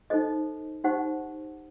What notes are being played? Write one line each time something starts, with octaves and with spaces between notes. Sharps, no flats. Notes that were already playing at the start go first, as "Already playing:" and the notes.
D#4 A4 C5 D#5
D#4 G4 C5 F#5